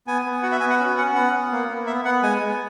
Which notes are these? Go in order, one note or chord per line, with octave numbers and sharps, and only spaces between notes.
B3 G#5
B3
F#4 F#5
E5
B3 G#5
F#5
C#4
C#4 F#5
B3 F#5
B3
A#3
A#3
B3 E5
B3 F#5
G#3 G#5
G#3